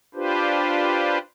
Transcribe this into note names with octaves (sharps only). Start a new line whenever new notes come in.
D4 F4 G4 B4 C5